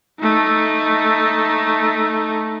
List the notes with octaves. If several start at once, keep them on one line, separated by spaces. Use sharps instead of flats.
A3 D#4